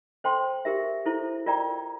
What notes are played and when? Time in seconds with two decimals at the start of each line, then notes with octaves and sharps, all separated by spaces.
0.24 A4 C5 G5 C6
0.65 G4 A#4 E5
1.06 E4 A4 C5
1.46 F4 A#4 D5 G5 A#5